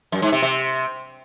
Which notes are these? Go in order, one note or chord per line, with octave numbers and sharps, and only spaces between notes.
F#2
G#2
C3
C3